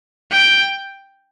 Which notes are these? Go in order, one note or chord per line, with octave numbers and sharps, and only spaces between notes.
G5